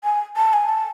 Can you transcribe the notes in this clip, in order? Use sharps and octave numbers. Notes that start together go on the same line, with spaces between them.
G#5
A5
G#5
A5